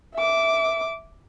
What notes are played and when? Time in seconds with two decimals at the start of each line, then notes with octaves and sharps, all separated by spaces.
0.14 E5 D6